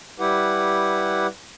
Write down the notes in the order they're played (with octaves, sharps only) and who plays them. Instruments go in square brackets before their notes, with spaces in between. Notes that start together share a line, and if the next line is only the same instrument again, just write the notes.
[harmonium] G3 E4 G4 B4 F#5